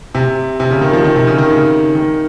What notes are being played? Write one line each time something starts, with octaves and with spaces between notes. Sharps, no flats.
C3
C3
C#3
D#3
F3
D#3
C3
C#3
D#3
C#3
D#3